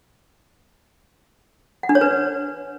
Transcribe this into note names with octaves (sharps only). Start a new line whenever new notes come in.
F#5
D4
C#5
B4